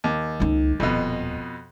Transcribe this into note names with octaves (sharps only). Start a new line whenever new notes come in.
D#2
C#2 D#4
D#1 F2 B2